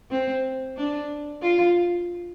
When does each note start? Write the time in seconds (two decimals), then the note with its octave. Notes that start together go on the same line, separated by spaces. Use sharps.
0.11 C4
0.77 D4
1.42 F4